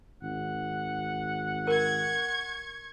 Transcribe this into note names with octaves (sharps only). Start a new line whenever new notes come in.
G#1 F#5
A#4 C#6 G#6